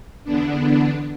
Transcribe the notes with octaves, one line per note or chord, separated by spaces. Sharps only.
E2 D3 B3 D4